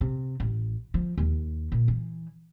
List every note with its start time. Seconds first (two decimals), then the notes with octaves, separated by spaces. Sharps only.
0.01 C3
0.40 A1
0.94 F3
1.18 D#2
1.72 A#2
1.88 E3